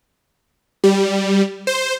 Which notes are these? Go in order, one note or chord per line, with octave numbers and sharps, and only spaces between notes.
G3
C5